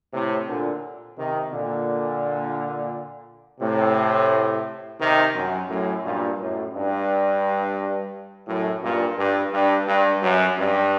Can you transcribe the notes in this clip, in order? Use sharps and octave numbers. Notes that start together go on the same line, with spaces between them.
A2 C3
A#2 D3
C3 D#3
A#2 D3
A2 C3
C3 D#3
F#2
F#2 A2
G2 A#2
F#2 A2
G2
F#2 A2
G2 A#2
G2
G2
G2
F#2
G2